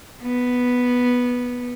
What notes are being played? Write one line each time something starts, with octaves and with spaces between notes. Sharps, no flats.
B3